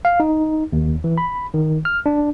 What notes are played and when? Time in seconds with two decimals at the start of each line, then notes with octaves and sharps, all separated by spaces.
0.05 F5
0.20 D#4
0.73 D#2
1.04 E3
1.18 B5
1.54 D#3
1.85 F6
2.06 D4